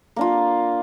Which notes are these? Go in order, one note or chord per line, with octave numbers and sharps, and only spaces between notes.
A#3 D4 F4